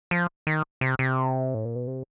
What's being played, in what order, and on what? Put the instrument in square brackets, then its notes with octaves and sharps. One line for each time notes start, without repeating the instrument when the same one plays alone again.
[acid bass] F3
D#3
C3
C3
A2
A#2
B2
C3